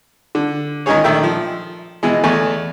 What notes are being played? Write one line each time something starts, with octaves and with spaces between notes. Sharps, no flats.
D3
D#3 G#3 C#4 D#4 G#4 C#5
A#1 D#3 A3 E5 G5
F3
B2 E3 G#3
E2 A3 G#5 C#6